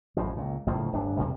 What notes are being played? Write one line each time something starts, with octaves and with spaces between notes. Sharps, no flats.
A1 F#2 A2 F3
C#2 A#2
F#1 D2 A2 F3
D1 G2 D4
E2 C3